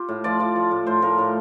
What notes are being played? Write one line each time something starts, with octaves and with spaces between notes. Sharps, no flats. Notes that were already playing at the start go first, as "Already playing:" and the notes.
Already playing: F4 G4 C5
A2
F3 D5
F3 D5
F3
A2
A2 C5
F3 A#4
A2